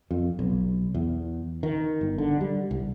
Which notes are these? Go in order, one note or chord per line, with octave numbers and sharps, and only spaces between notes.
F2
B1
E2
D#3
G1
D3
G3
C2